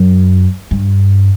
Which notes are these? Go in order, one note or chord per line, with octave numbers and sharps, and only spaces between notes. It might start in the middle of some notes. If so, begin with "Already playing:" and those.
Already playing: F#2
G2